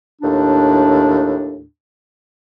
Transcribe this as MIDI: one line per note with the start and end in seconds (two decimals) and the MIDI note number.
0.22 1.64 39
0.22 1.64 45
0.22 1.64 62